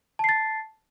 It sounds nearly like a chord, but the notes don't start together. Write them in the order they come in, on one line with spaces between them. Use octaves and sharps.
A5 C7 A6